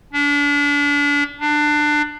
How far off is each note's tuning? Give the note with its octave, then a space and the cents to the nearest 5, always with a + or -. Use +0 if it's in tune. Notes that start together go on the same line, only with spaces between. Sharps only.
D4 -35
D4 +20